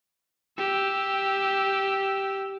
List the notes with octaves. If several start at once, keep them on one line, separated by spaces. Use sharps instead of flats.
G4 E6